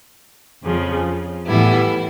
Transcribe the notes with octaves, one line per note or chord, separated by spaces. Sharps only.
F2 C#3 F3
A2 E3 G3 B3 E4